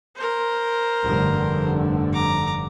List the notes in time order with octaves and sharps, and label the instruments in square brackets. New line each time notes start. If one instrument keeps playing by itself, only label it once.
[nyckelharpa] A#4 C5
[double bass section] F1 G2 D3
[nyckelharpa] A#5 D6